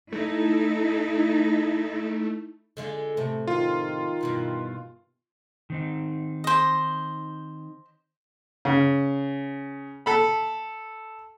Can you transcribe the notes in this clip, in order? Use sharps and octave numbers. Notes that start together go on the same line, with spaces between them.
A3 D#4 E4 A4
D3 G#3 F4
A2 C3 A3
D#3 F4
G2 B2 E3
D#3 C4 D#4
C5 D#5
C#3
A4 B5